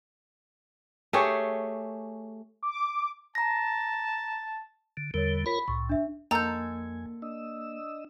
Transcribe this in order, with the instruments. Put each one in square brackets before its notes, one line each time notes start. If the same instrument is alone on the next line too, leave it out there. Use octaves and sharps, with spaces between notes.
[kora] A3 G4 G#4 C#5
[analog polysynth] D6
[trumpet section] A5 [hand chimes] A#5 A#6
[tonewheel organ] D3
[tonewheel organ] E2 D3 G3 [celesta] A#4 C#5
[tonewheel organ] F4 A#4 C#5 [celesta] B5 B6
[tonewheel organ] C2 A2 [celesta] C#6
[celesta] D4 E5
[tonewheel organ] F2 G#5 [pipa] D3 D#4 A4 [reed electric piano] A#3 [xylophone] A#5 G6
[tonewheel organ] D4 D#5 E6